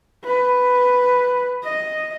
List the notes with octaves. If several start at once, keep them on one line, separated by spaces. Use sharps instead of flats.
B4
D#5